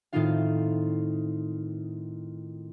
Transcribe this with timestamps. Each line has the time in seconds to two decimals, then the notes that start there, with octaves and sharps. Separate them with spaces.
0.13 A2 D#3 C4 D#4 F4 F5